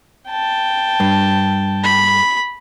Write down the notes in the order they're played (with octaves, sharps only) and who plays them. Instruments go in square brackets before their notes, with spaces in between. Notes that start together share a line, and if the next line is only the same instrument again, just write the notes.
[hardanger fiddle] G5 A5
[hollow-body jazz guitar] G2
[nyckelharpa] B5